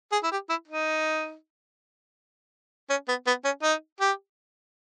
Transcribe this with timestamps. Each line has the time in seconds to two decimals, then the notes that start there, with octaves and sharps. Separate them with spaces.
0.12 G#4
0.24 E4
0.32 G4
0.49 E4
0.68 D#4
2.90 C#4
3.08 B3
3.27 B3
3.45 C#4
3.63 D#4
4.01 G4